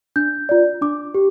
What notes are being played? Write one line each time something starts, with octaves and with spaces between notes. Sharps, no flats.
D4 G6
F4 D5
D4 D6
G4